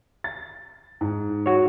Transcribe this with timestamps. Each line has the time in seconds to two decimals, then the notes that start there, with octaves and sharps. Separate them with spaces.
0.24 A6
1.01 G#2
1.46 F#4 C#5